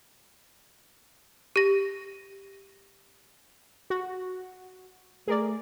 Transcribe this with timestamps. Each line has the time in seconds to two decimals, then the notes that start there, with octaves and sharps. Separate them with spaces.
1.56 G4 A#6
3.90 F#4
5.28 A3 G#4 A#4 D5